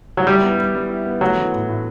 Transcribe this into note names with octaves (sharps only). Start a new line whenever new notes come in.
F#3
G3 E4
B3
G3
G3
E4
B3
F#3 A3
E3
A2
A2